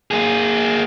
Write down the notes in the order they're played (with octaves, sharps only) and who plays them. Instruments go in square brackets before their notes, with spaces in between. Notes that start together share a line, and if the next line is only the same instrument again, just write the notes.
[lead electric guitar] A#3 G#4